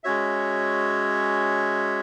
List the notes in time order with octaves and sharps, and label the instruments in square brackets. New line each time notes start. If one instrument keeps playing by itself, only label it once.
[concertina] G#3 C#4 F#4 C#5 E5